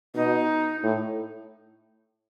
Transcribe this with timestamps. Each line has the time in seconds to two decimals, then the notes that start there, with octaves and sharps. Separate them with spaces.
0.15 B2 D#4
0.84 A2